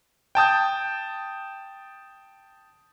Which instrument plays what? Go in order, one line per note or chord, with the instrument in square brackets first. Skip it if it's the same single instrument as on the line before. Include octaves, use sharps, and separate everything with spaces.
[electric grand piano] G5 A5 D#6 G6